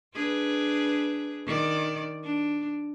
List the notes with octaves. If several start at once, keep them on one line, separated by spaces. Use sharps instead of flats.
D4 G#4 B4
D#3 D5
D4